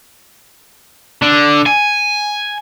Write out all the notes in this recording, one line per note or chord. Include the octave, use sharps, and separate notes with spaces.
D3
G#5